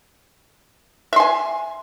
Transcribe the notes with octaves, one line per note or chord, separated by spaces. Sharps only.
E5 G#5 C6